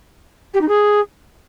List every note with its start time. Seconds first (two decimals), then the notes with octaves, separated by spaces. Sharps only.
0.53 G4
0.61 D#4
0.68 G#4